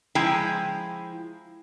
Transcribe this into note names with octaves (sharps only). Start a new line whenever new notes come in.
F3 G#3 E4 G5 A#5